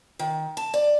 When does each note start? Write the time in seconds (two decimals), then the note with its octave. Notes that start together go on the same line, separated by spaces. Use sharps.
0.19 D#3
0.57 A5
0.74 D5